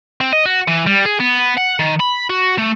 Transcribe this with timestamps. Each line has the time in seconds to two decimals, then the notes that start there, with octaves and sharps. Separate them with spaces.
0.21 C4
0.33 D#5
0.46 F#4
0.68 E3
0.87 G3
1.05 G#4
1.20 B3
1.58 F#5
1.79 D#3
2.00 B5
2.30 F#4
2.58 A3